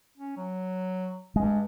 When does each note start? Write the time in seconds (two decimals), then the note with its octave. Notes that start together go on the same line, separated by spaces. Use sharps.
0.18 C#4
0.37 F#3
1.36 G2 G#3